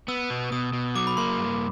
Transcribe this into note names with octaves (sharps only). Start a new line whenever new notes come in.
B3 E6
B2
B2 D#6
B2
F#3 D6
B5
A#3 C6
G2